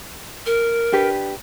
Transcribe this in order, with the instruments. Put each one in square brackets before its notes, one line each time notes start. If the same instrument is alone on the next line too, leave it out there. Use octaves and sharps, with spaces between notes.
[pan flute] A#4
[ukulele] D4 G4 B4